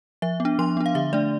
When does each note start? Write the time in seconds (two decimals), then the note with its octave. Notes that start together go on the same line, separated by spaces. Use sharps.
0.22 F3 E5
0.40 B3
0.45 D4
0.59 F3 C6
0.77 B3 D4
0.86 F5
0.95 D3 E5
1.13 A3 D4 D5